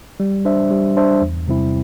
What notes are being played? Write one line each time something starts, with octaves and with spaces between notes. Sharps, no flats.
G3
D4 C5 E5
G3
D4 C5 E5
E2
C3 G3 C4 E4